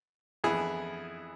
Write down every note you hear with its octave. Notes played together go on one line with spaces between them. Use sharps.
F2 E3 B3 E4 G#4